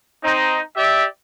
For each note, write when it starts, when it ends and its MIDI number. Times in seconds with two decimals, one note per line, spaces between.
0.22 0.60 60
0.22 0.60 63
0.77 1.04 67
0.77 1.04 74
0.77 1.04 76